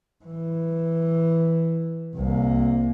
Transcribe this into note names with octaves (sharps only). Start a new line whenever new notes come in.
E3
C2 A#3